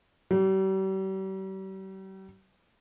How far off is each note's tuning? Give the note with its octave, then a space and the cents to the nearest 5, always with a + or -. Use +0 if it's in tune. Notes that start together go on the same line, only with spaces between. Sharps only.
G3 -40